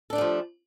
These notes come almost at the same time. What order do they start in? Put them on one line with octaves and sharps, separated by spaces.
A4 D4 A3 G3 F3